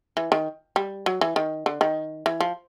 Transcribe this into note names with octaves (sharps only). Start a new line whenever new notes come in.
E3
D#3
G3
F#3
E3
D#3
D3
D#3
E3
F3